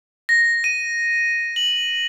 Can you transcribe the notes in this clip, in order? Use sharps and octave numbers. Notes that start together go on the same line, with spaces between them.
A#6
D#7
F#7